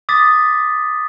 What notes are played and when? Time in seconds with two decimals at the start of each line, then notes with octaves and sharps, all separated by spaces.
0.09 D6 D#6 A6 B6